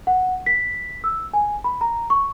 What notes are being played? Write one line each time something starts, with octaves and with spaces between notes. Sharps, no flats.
F#5
B6
E6
G#5
B5
A#5
C#6